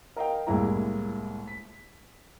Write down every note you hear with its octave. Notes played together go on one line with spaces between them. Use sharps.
A#4 D#5 F5 G5
C2 A2 G#3 A#3 E4 A#5
B6